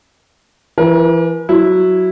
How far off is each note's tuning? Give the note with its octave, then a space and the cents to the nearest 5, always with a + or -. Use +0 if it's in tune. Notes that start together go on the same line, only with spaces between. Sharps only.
E3 +25 A#4 +45
F#3 +0 E4 +0